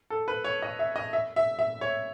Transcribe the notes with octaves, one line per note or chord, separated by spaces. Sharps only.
A4
B4
C#5
D#5
E5
D#5
E5
E5
E5
C#5